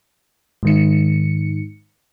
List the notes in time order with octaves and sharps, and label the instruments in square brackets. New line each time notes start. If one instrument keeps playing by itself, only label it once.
[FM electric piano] G#2 D#3 C#7